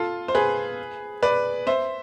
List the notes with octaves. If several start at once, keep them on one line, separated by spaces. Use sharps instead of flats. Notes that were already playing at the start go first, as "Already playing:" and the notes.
Already playing: F4 A4
C5
G#4 B4
B4 D5
C5 E5